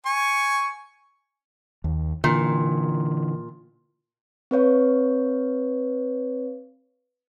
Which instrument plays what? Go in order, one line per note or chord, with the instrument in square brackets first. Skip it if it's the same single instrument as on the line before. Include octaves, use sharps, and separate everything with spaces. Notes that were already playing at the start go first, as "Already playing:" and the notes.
[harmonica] G#5 C#6
[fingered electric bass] D#2
[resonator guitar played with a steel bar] A#2 [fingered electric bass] D3 E3
[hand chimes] C4 B4 C#5 F5